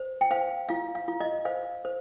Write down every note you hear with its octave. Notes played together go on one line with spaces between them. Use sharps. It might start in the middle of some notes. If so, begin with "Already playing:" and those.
Already playing: C5
G5
C5 F5
F4 F5
F5
F4
D#5
C5 F5
C5